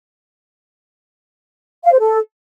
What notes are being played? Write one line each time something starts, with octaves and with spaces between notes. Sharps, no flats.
F5
C5
A4